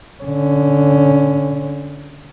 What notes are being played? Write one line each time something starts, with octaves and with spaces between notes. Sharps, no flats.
D3 C#4